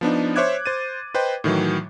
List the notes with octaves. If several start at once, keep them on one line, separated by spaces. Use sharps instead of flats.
F3 B3 D4 D#4
C5 C#5 E5 D6 F#6 G#6
C5 A6 D#7
B4 C5 D#5 G5
A2 D#3 E3 F#3